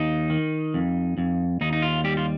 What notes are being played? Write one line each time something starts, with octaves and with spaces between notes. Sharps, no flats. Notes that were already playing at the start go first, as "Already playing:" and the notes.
Already playing: D#2 D#4
D#3
F2
F2
D#2 D#4
D#4
F4
G3 G4
F4